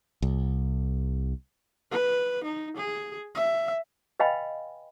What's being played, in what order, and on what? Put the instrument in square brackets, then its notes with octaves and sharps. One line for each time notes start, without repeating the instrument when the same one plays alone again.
[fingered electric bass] C2
[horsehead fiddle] B4
D#4
G#4
E5
[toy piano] B4 D#5 F5 G5 G#5 B5